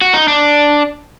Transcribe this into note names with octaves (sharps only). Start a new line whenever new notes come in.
F#4
D#4
D4